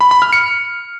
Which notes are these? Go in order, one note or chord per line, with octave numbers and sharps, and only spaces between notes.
B5
B5
F6
C#7